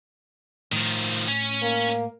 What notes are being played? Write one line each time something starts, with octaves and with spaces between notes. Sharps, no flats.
A2 D#3 F3
C#4
A#3